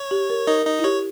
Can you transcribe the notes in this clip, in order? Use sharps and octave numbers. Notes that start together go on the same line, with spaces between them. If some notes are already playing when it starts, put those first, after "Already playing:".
Already playing: C#5
G4
A#4
D#4 A#4 D#5
D#4 D#5
E4
G4 C#5